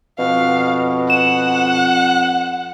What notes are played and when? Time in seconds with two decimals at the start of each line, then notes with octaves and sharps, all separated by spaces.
0.19 F2 B2 F5
1.10 F#5 E7